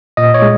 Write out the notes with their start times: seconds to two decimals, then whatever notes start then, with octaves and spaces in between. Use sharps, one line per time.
0.17 A#2 D#5
0.34 C#5
0.42 G#3